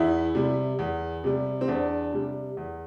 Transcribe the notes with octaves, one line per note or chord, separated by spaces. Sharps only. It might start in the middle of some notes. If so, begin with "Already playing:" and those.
Already playing: E2 E4
C3 G3
E2
C3 G3
C4
E2 D4
C3 G3
E2